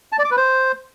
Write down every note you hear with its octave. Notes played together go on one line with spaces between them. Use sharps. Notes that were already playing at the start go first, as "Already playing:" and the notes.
A5
D5
D6
B4
C5